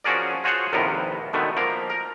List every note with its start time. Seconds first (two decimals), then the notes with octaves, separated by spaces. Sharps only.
0.04 F3 C#4 F#4 G#4 A#4 D5
0.44 F4 F#4 G#4 C5 C#5 F#5
0.73 A#1 D#2 A2 C3 B3 A#4
1.33 B2 D3 D#3 A3 B3
1.57 F3 A#3 A#4
1.90 A#4